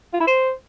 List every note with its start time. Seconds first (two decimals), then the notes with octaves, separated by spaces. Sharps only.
0.14 F4
0.20 E4
0.27 C5